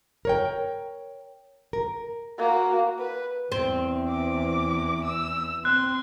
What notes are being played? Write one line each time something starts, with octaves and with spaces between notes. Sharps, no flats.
A#4 C#5 G5
A#4
A#3 F#4
B4
E2 E3 C4
D6
E6
C4 C6 F#6